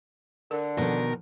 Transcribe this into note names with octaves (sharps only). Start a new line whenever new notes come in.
D3 A#4
B2 D#3 F3 A4 A#4